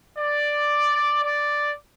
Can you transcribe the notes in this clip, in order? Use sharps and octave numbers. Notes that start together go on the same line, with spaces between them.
D5
D5